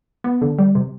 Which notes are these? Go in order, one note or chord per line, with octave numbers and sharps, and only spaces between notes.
B3
D3
G3
C3